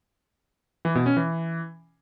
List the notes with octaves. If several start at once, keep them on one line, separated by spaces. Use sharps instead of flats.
E3
B2
C#4
E3